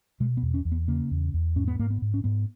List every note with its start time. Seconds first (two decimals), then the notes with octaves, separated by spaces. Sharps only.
0.20 B2 G#3
0.37 B3
0.43 E2
0.54 C#4
0.65 E2
0.72 B3
0.88 C#3 A#3
1.11 E2
1.34 E2
1.56 G#2 C#4
1.68 B3
1.79 G#2 A#3
1.90 B3
2.02 G#2
2.14 C#4
2.24 G#2 B3